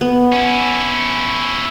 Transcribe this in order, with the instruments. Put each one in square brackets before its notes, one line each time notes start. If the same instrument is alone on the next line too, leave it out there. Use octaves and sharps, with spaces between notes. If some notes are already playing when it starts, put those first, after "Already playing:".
[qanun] B3
[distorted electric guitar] C#4 E4